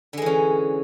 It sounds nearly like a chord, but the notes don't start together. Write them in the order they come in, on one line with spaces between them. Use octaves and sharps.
D3 G#3 E3 C#4